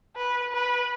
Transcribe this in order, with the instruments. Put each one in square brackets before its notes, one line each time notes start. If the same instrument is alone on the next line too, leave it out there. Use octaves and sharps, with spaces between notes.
[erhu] B4
B4